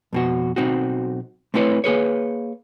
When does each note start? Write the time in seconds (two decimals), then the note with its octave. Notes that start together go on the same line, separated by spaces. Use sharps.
0.13 F2 B2 F#4
0.56 B1 C4 D#4 F#4
1.54 A3 C4 E4 B4 C#5
1.84 A#3 G#4 B4 C#5